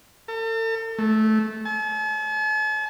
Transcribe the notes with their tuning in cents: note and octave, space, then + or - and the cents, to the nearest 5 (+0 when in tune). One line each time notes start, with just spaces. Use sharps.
A4 +40
A3 -15
A5 -45